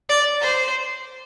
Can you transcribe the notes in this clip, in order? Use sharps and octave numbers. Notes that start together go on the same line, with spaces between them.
D5
C5